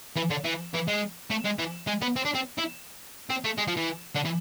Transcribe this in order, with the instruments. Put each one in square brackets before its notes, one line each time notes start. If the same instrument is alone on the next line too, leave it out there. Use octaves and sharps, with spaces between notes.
[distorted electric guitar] E3
D3
E3
E3
G#3
A3
G#3
E3
G#3
B3
C4
D4
C4
E4
C4
A3
G#3
F3
E3
D3
E3